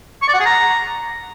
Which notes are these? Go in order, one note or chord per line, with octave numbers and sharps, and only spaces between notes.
C#6
D5
F#5
G#4
A#5